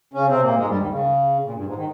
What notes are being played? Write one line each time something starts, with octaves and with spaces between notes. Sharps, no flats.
C#3 C#4
C3 C4
A#2 A#3
G#2 G#3
G2 G3
D#2 D#3
C#3
A#2
G2
G#2
D#3